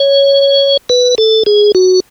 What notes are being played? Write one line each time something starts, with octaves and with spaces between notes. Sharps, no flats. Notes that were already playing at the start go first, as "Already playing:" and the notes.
Already playing: C#5
B4
A4
G#4
F#4